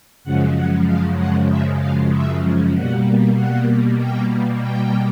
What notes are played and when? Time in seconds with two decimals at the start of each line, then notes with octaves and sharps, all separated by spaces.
0.24 F#2 C#3 F3 G#3 F#5
0.55 F#5
0.87 F5
1.18 F#5
1.50 E5
1.80 F5
2.12 E5
2.74 B2 G3 A#3 F#5
3.36 F#5
3.99 G5
4.61 G5